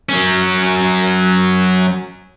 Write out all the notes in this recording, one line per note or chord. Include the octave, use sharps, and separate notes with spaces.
F#3 C#4